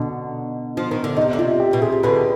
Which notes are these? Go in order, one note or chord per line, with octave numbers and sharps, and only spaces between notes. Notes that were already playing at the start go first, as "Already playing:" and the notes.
Already playing: B2 D3 D#4
F3
D#3
D3
C3 D#4
D3
C3 F4
G4
B2
C3 G#4
B2 D3 B4